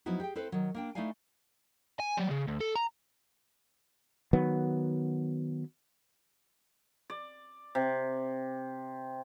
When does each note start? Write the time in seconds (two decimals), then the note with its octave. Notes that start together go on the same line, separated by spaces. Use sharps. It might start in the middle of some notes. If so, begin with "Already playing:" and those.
0.06 F3 F#3 B3 D#4 E4 F#4
0.20 G4 G#4 G5
0.36 C4 E4 A4 B4 C5
0.52 D#3 F#3
0.74 A#3 D4 G5
0.95 A3 D#4 E4 D5 F5 G#5
2.00 G#5
2.17 F#3 G3
2.30 C#3
2.47 D2
2.60 A4
2.75 A#5
4.33 D#3 F#3 B3
7.10 D5
7.75 C3